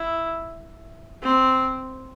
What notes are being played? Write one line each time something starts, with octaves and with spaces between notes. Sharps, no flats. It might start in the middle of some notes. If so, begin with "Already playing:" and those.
Already playing: E4
C4